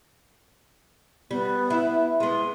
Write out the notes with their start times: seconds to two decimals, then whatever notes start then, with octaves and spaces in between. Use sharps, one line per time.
1.31 G3 B3
1.70 E4
2.20 G#3 B3 C6